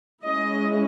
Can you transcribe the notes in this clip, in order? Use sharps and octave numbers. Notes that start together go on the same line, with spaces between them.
G#3 C#4 E4 D#5